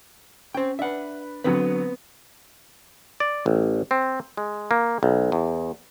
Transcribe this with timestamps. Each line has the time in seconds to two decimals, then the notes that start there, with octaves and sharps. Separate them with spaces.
0.54 C#4 C5 G5
0.79 D4 B4 E5 F#5
1.44 D3 F#3 B3 C4 B4
3.20 D5
3.46 A1
3.91 C4
4.37 G#3
4.71 A#3
5.03 B1
5.32 E2